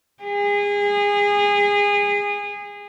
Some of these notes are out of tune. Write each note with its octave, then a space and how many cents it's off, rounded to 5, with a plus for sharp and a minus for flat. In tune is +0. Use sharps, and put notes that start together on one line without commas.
G#4 -25